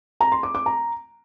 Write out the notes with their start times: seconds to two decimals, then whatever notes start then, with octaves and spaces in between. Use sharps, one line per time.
0.20 A#5
0.32 C6
0.43 D6
0.55 D6
0.66 A#5